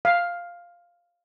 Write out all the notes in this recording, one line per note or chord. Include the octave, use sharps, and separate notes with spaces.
F5